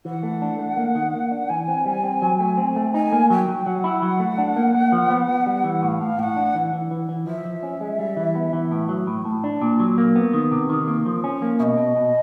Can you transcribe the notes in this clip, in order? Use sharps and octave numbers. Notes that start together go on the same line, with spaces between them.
E3 F#5
A3
D4
A3
A#3
D#3
A#3
D4
E3 G#5
C4
G3
C4
F#3
A3
C4
A3
D#4 G#5
A#3
F#3 G5
F#3
F#3 F#5
E4
F#3
A3
D4
A#3
A#3
F3
B3
B3
G3
E3
A2 F#5
F5
A2
A2 F#5 G5
D4
E3
E3
E3
E3
F3 E5
F3
C#4
G#3
G3
E3
B3
E3
A2
F#3
A2
A2
D4
A#2
F#3
A#3
B3
D#3
C3
D#3
A#3
F3
C#4
A#3
B2 D#5 E5
B2
B2